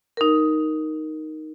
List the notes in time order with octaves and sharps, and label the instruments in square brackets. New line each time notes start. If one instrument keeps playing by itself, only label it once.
[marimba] D#4 A#4